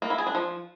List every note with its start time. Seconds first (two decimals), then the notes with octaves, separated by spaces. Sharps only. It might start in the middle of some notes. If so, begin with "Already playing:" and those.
0.02 A#3
0.10 E4
0.18 G#4
0.27 D4
0.35 F3